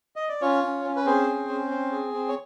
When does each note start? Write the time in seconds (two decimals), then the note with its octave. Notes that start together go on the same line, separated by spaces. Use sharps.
0.16 D#5
0.29 D5
0.41 C#4 F4 C#5
0.64 C#4
0.85 C#4
0.96 B4
1.06 C4 G#4 C5
1.28 C#4
1.49 C#4
1.71 C4
1.92 G#4
2.14 C4
2.28 C#5